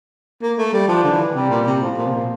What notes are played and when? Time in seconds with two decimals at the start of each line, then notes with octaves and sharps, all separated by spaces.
0.42 A#3
0.58 A3
0.73 G3
0.88 F3 D4
1.03 D3
1.11 E3
1.35 C3 G3
1.50 A#2
1.66 C3
1.81 A2 F3
1.97 A#2
2.06 C3
2.12 A#2